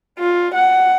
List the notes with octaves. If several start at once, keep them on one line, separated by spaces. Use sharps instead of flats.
F4
F#5